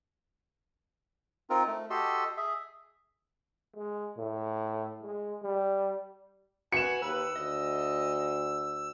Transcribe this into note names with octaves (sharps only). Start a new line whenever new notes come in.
C4 D#4 F4 A#4
A3
F#4 G4 A4 D#5 C6 E6
G#4 E5
G#3
A2
G#3
G3
F#4 B4 G#5 C#7 E7
D#2 B4 E6
D2 D#5